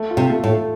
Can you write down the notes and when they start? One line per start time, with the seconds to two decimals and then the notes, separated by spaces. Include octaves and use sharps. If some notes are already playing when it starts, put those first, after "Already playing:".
Already playing: A3
0.10 F4
0.17 C3
0.30 A3
0.44 A2
0.49 A3